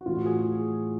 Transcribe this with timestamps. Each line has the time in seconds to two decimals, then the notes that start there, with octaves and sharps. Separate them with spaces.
0.01 F#4
0.06 A2 E3 F4
0.17 F#4
0.26 G#4